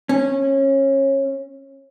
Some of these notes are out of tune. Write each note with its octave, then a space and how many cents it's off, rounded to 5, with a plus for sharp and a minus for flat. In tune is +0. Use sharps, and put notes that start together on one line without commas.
C#4 -25